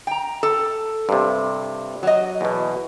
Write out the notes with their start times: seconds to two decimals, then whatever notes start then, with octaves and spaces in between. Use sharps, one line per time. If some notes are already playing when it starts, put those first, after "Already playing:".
0.07 G5 A#5
0.43 A4
1.09 G2 C3
2.03 F#3 D#5
2.41 E2 B2